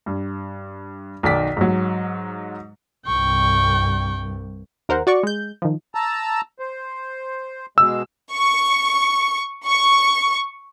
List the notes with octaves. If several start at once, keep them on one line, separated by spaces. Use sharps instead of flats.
G2
B1 D#3 D5 B6
G#2 F#3
C2 G2 G5 C#6
D#2 A#4 C5 F#5
F#4 D5 C#6
G#3 G6
D#3 F3
A5 A#5 E6
C5
B2 G#3 E6
C#6
C#6